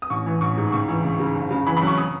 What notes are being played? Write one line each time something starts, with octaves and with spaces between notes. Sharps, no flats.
D#6
A1 C#6
E3
A1 C#6
G#2
C#2 C#6
E3
C#2
C#3
F#1
C#3
E3 B5
B5
F#2
C#6
D#6